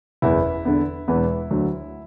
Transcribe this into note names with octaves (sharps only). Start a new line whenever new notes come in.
F#1 E2 E3 B3 E4
E2 D3 B3
E1 E2 E3 B3
D2 D3 F#3